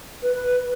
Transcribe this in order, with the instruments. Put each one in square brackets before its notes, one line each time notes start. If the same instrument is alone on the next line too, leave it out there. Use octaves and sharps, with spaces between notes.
[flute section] B4